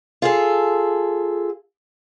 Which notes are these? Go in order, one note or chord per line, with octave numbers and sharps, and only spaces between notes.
F4 G#4 A4